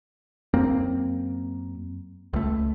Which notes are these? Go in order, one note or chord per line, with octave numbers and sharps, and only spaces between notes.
F#2 A#3 C4
C#2 A3